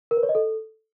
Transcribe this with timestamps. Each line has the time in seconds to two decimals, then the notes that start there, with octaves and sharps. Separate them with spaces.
0.11 A#4
0.17 B4
0.23 C#5
0.29 D#5
0.35 A4